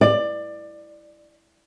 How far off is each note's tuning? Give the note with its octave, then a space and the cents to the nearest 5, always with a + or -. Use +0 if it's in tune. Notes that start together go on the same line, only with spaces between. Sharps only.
D5 +20